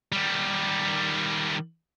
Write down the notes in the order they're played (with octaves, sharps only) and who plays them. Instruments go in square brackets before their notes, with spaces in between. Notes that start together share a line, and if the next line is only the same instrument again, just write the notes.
[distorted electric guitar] D#3 G3